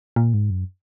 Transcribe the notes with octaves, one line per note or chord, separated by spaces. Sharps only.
A#2
G#2
F#2